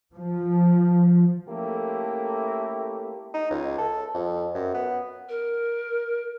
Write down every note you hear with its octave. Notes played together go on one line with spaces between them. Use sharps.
F3
A3 A#3 C#4 E4 G4 A4
D#4
C#2
A4
F2
F#2
B3
A#4